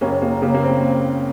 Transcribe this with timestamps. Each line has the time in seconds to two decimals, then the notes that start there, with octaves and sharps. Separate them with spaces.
0.01 F#1 A#3 C#4
0.22 A#3
0.42 C#3 A#3
0.54 A#3
0.62 C4